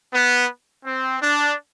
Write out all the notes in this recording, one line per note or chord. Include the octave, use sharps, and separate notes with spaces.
B3
C4
D4